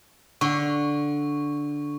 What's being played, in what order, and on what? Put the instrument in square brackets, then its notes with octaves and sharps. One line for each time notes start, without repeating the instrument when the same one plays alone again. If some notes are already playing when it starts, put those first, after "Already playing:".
[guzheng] D3 [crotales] C#6